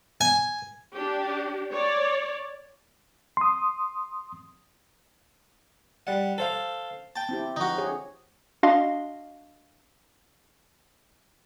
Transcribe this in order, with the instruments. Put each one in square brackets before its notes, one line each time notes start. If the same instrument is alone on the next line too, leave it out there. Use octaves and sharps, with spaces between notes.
[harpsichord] G#5
[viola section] D4 G4
C#5 D5
[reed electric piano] C6 D#6
[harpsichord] G3 F#5
A4 C5 F5
G5 A5
[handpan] C4 E4 G4
[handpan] D3 F3 [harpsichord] D#4 F#4
[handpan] G4 G#4 C#5
[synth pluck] D4 F#4 D#5 F5 C6